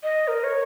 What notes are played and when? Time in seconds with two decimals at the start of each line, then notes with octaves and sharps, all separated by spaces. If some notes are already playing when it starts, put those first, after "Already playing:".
0.03 D#5
0.28 A#4
0.44 C#5